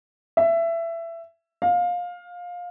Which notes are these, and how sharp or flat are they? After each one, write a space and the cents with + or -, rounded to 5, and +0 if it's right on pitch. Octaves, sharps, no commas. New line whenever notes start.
E5 +20
F5 +20